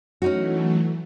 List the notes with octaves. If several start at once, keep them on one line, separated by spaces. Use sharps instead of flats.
E3 F#3 A3 C#4 D#4 F#4